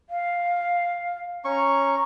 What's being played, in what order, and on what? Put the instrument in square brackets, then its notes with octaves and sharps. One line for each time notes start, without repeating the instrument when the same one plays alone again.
[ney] F5
[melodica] C#4 C#6 [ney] A#5